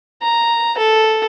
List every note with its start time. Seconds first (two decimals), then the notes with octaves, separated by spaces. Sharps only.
0.22 A#5
0.78 A4